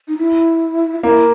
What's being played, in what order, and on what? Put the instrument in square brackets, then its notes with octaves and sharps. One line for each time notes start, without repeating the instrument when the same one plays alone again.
[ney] D#4
E4
[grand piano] A#3 [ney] E4